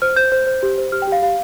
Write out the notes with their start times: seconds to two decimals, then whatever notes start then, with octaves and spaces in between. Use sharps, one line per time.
0.02 C5 F6
0.16 C5 G6
0.32 C5
0.47 C5
0.63 G4
0.78 C5
0.92 G4 F6
1.02 G5
1.07 G4 F5
1.22 G4 F5